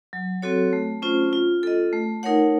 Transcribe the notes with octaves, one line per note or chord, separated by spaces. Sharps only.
F#3
C4 F#4 A4 C#5
A3
C#4 F4 C5
F4
A4 D#5
A3
D#4 A#4 C#5 F#5